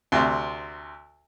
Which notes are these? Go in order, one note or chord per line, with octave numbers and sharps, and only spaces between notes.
D2 C3